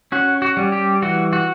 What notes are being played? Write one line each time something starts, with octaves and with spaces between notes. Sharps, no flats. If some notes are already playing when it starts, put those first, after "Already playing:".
C#4 F#4
F#4
G3
G4
E3 F#4
F#4